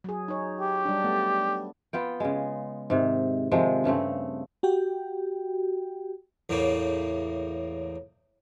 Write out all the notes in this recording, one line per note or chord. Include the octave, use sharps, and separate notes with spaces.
F#3 G#4
D#4 C#5
G4
G3 D4
A3 B3
B3 F4 G5
C#3 G#3
G#2 C3 D#3
C3 D#3 F3 G#3
G2 C#3 A3 C4
F#4 G4 G5
E2 A2 C#3 A#3